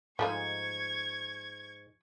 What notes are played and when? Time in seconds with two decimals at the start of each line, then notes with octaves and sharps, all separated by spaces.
0.19 G#2 F3 A3 D#4 C#6 G#6